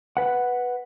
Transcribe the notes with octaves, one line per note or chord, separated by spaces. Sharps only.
B4 F#5